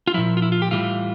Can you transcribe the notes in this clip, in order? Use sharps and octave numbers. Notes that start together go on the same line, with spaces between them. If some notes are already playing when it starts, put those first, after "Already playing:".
F4
A#2 F3 E4
F4
E4
F4
G4
A2 E3 G3 F4